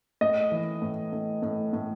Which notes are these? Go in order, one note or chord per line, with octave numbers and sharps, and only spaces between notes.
A2 D#5
E3
A2
A2
A2
A2